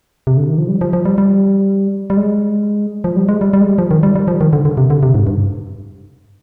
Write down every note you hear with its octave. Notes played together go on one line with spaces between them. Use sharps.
C3
D3
D#3
F3
G3
F3
F3
G3
G3
G3
G#3
F3
G3
G#3
G3
G3
G#3
G3
F3
D#3
G3
G3
F3
D#3
D3
D3
C3
D3
C3
G#2
G2